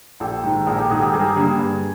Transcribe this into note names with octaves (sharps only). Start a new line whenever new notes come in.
A#1 G4 A4
G#2 D#3
A#1 G#4 A#4
G4 A4
G#2 D#3 F#4 G#4
G4 A4
G2 G#4 A#4
D3 G3 A#3
G2